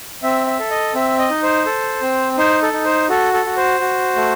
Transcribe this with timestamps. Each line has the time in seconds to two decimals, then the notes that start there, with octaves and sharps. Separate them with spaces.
0.23 C4 E5
0.47 E5
0.59 A4
0.71 D#5
0.94 C4 E5
1.19 D#5
1.30 D#4
1.43 C5
1.66 A4
2.02 C4
2.38 D#4 C5
2.62 A4
2.73 D#4
2.85 C5
3.09 F#4 A4
3.34 A4
3.46 F#4
3.57 C5
3.80 F#4
4.16 A3